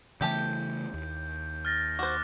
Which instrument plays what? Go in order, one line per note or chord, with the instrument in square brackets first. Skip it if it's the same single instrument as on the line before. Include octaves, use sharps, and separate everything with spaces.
[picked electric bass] C#3 E3 A3 [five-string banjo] E4 G4 A4 [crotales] G6
[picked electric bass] D#2
[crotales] F6 A6 A#6
[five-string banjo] F#4 C5 [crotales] D6 F#6